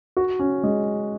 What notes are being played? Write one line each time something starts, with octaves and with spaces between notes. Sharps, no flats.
F#4
C#4
G#3